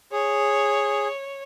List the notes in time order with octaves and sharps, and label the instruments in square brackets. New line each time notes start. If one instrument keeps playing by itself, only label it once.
[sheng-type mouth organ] G#4 [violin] C#5